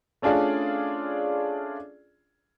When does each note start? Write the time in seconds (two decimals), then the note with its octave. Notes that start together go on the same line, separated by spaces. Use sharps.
0.22 A3 C#4 D4 F4 G#4 D5